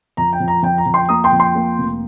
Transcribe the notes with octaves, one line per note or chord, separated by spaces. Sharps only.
F2 A#5
G5
F2
A#5
F2 G5
A#5
F2
G5 C6
A#3 A#5 D#6
G5 C6
F2
G5 C6
A#3
F1